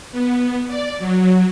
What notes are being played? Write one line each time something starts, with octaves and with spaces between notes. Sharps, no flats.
B3
D5
F#3